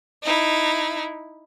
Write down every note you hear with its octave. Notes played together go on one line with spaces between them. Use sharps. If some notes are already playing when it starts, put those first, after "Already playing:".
D#4 E4